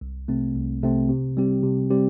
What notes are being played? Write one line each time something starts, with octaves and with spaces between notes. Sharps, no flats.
C2
C3 A3 C4
C2
C3 A3 C4
C3
G3 C4 G4
C3
G3 C4 G4